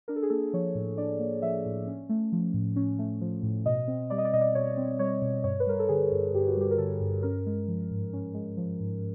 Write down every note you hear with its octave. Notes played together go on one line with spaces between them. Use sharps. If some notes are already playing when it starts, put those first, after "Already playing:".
D4 A#4
A4
G#4
A#3 A4
F3 C#5
A2
D4 D5
A#3
F3 E5
A2
C#4
A3
F3
A2
C#4
A3
F3
A2
B2 D#5
C4
G3 D5
D#5
D5
B2 D#5
D5
B2 C#5
C4
G3 C#5
B2
G2 C#5
B4
G3 A#4
A4
D3 G#4
G2
G2 G4
F#4
G3 G4
A#4
D3 A4
G2
C#4 A#4
G#3
F3
G#2
C#4
G#3
F3
G#2